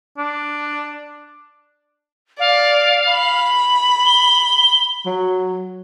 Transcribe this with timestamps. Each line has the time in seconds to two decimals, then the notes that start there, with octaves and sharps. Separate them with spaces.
0.17 D4
2.39 D5 F5
3.11 B5
4.06 G7
5.06 F#3